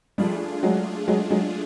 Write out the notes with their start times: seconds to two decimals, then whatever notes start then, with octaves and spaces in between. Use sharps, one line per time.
0.18 F3 G3 A3 D4 F4 G#4
0.63 F#3 G#3
1.08 F#3 G#3
1.30 F#3 G#3